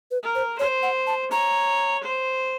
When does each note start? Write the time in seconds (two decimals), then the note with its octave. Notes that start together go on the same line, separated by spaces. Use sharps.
0.11 B4
0.22 A#4
0.35 C5
0.58 C5 C#5
0.83 F#5
1.07 A5
1.31 C#5 A#5
2.03 C5